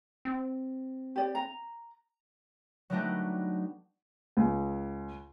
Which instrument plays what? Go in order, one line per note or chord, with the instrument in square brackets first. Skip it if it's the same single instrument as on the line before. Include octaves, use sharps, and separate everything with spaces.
[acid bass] C4
[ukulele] G4 D5
A#5
[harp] F#3 G3 A3 B3 D4 D#4
[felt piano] C#2